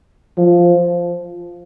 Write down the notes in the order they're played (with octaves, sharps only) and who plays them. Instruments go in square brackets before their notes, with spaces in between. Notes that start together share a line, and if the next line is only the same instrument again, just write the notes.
[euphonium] F3